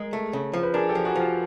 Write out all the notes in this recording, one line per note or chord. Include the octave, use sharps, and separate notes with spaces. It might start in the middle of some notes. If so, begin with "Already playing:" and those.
Already playing: G#3 A#4
A3
C#3
F3
B4
D4 G#4 A#4
G4 A4
F3
F#4 G#4
F3 F4 G4